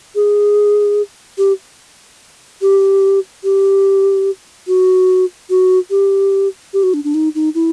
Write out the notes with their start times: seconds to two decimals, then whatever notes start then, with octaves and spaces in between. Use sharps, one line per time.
0.15 G#4
1.38 G4
2.62 G4
3.44 G4
4.67 F#4
5.50 F#4
5.90 G4
6.73 G4
6.83 F#4
6.94 D4
7.04 D4
7.14 D#4
7.35 D#4
7.55 E4